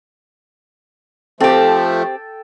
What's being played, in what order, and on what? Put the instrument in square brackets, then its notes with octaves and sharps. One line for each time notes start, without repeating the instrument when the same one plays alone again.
[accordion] F3 A3 [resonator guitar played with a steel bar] C4 G4 [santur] A4 G5